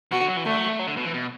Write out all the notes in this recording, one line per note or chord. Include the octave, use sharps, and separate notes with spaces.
B2 F#4
D3
F#3
E3
D3 A3
F#3
A3
F#3
D3
B2
E3
B2